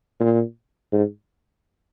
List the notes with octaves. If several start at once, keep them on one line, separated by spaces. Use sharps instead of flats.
A#2
G#2